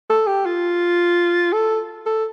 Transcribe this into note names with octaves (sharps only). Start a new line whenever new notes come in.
A4
G4
F4
A4
A4